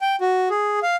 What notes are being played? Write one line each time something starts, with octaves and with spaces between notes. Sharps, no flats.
G5
F#4
G#4
F5